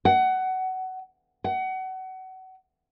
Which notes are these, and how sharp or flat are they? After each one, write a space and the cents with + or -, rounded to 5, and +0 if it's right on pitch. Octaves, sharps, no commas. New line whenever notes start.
F#5 +20
F#5 +30